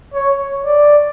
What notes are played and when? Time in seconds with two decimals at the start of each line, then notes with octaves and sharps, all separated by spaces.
0.14 C#5
0.65 D5